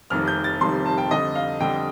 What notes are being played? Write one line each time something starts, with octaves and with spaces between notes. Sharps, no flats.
F1 F2 C3 D#3 G3 F6
G6
A6
F1 F2 C3 D#3 G3 C6
A5
G5
F2 D3 G3 D#5
F5
F2 D3 G3 G5